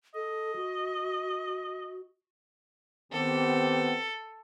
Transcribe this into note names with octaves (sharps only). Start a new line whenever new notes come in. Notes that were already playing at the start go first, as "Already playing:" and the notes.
A4 D#5
F#4
D#3 B3 C4 G4 A4